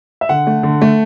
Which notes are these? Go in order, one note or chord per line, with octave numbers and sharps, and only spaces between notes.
E5
D3 F#5
A3
D3
A3